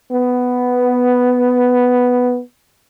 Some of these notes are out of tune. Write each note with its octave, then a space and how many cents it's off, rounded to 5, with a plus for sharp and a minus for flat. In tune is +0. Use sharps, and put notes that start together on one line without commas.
B3 +5